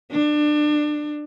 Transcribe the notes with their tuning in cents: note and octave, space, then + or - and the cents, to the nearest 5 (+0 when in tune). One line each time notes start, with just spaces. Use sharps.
D4 +25